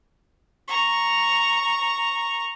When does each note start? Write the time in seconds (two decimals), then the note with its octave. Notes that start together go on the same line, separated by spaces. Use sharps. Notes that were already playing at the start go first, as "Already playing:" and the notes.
0.68 A#5 C#6